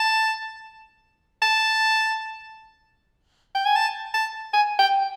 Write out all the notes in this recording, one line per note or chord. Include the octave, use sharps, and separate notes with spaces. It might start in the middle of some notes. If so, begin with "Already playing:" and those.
Already playing: A5
A5
G5
G#5
A5
A5
G#5
G5